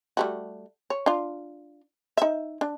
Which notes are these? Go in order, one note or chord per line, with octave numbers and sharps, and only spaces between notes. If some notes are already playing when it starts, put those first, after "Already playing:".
G3 A3 F#4
C#5
D4 F4
D#4 E5
D4